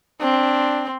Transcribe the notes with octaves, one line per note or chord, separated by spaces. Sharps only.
C4 D4